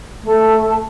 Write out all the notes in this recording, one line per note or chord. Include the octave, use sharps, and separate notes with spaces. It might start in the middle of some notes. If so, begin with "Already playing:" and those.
A3